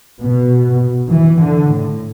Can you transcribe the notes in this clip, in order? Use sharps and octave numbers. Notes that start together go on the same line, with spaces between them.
B2
E3
D3
A2